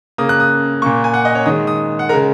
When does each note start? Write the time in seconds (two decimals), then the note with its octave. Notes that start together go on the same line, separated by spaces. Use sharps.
0.18 C#3 A#3 D#6
0.29 F#6
0.40 D#6
0.82 A#2 A#3 C#6
1.04 G#5
1.14 F#5
1.25 D#5
1.35 C#5
1.46 D#3 G#3 D#6
1.67 D#6
1.99 F#5
2.09 C#3 G#3 A#4